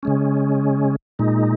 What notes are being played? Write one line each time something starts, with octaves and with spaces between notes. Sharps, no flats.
C#3 G#3 C#4
A#2 G#3 D#4